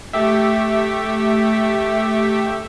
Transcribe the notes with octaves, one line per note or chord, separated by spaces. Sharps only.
A3 G4 E5